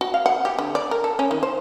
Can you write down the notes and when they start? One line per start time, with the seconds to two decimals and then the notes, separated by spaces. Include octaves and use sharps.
0.01 F#4
0.14 F5
0.26 F#5
0.45 G4
0.59 D3
0.75 D5
0.91 A#4
1.04 A4
1.19 C#4
1.31 D#3
1.43 C5